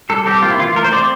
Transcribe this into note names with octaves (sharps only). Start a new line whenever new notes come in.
G3 A4
C4 G4
A#3 F4
E4
E3 F4
A3 A#4
C5
C4 D5